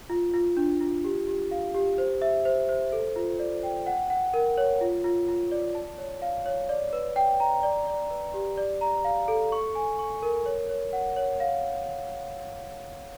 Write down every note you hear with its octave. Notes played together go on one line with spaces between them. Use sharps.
F4
F4
D4
F4
G4
G4
F5
G4
C5
E5
C5
C5
A4
F4
D5
G5
F#5
F#5
A#4
C#5
F4
F4
F4
D5
A5
C#5
F5
C#5
D5
B4
G5
A#5
D5
D5
B4
G4
D5
A#5
F5
A4
C#6
G#5
C#6
A#4
C#5
C#5
F#5
C#5
F5